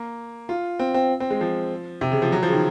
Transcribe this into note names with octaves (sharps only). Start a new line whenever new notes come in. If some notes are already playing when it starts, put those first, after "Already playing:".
Already playing: A#3
F4
C4
C4
C4
G#3
F3
C3
C#3
F3
F#3
F3
C#3
D#3